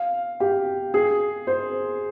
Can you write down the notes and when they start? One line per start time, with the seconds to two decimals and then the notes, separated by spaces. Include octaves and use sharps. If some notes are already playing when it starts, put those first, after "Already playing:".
Already playing: F5
0.40 G4
0.94 G#4
1.47 C5